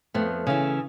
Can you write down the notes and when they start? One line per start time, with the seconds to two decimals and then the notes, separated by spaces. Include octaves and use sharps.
0.14 F2 A3 B3
0.47 C#3 E3